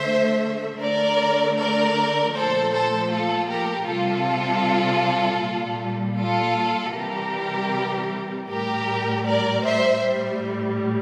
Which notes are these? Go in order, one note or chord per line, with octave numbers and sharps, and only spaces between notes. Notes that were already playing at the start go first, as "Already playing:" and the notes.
Already playing: D3 A3 C5 E5
D3 A3 A#4 D5
A#4 D5
A#2 F3 A3 A4 C5
A4 C5
F4 A4
G4 A#4
C3 G3 F4 A4
A#2 G3
F4 A4
C3 E3 G3 G4 A#4
A2 G3 G4 A#4
A#4 D5
C5 E5
A2 G3